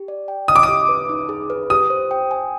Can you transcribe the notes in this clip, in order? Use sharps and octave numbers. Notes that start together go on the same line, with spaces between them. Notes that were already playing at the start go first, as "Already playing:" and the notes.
Already playing: G4
D5
G5
D#5 D#6
D6
D#6
G4
B4
D#4
G#4
B4
G4 D#6
C5
G5
G#5